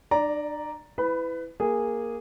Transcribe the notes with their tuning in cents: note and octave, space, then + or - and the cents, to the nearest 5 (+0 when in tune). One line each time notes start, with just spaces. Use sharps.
D4 +40 D5 +0 A#5 +0
E4 +0 B4 +25 B5 +0
A#3 +0 G#4 -10